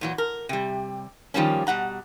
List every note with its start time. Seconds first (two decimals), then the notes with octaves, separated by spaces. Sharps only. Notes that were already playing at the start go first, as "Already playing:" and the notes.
0.01 A#2 E3 F#3
0.18 A#4
0.49 C3 G3
1.34 D#3 F3 G3 A#3 C#4
1.67 B2 G3 F#5 A#5